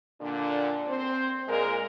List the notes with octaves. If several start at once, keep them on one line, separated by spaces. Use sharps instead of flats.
A#2 D3 D4
C4 C5
A#2 G#3 A#4